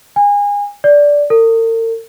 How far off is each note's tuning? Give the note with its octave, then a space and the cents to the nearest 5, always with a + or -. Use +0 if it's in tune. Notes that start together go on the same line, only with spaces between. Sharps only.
G#5 -30
D5 -10
A#4 -45